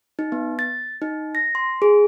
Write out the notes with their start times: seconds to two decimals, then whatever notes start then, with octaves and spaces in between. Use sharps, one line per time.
0.19 D#4
0.32 B3
0.59 A6
1.02 D#4
1.35 A#6
1.55 C6
1.82 G#4